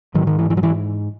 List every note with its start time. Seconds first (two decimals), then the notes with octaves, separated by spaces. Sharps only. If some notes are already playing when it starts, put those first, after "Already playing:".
0.14 G#2 D#3 F#3
0.27 D#3
0.39 E3
0.50 E3
0.57 F#3
0.63 E3